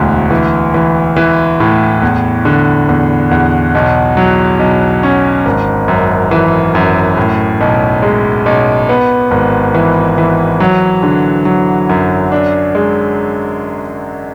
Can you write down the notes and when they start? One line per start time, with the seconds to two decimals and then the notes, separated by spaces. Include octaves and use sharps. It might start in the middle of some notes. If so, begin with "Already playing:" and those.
Already playing: E1 D2 E3
0.30 E3
0.74 E3
1.16 E3
1.60 A2
2.02 E2
2.45 D3
2.89 E2
3.31 E2
3.75 B1
4.17 F#3
4.59 B1
5.03 C#4
5.46 G#1
5.88 F#2
6.31 E3
6.75 F#2
7.17 A2
7.61 B1
8.02 G#3
8.46 B1
8.89 B3
9.31 G#1
9.74 E3
10.18 E3
10.60 F#3
11.03 D3
11.45 F#3
11.89 F#2
12.32 D4
12.75 G#3